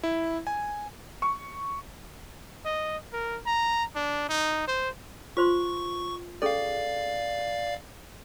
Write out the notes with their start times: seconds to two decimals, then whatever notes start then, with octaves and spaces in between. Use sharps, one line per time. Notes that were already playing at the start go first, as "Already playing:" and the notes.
0.03 E4
0.47 G#5
1.22 C#6
2.65 D#5
3.13 A#4
3.46 A#5
3.95 D4
4.29 D#4
4.68 C5
5.37 F4 C5 C6 C#6
6.42 C#4 G#4 A4 D5 F5